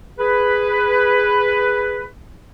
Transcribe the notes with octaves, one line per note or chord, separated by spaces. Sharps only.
G#4 B4